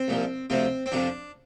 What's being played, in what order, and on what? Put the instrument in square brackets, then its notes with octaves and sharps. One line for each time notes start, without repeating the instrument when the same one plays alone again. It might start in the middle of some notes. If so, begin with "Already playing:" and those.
Already playing: [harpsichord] C4
C2 A#2 F3
D2 C3 F3 C4
C4
F2 C3 F3 D4